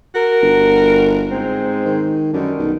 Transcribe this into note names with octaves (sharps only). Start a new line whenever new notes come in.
F#4 A#4
G1
G#2 G#3 C4
D#3
F#2 D3 D#3 G3
B1